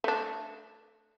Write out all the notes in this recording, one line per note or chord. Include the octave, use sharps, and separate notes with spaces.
A3 D4